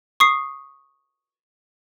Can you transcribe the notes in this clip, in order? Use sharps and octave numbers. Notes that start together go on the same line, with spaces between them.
C#6 D#6 C7